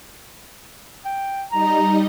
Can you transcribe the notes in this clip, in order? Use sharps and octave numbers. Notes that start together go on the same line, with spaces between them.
G5
G3 D#4 D#5 A#5